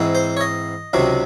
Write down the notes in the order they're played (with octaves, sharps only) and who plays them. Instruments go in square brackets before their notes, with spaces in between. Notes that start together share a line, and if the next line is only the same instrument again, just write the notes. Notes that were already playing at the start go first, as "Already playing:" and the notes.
Already playing: [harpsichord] G#2 E3 C4 D#4
C5
C#5
D#5
C#2 C3 D#3 F#3 C4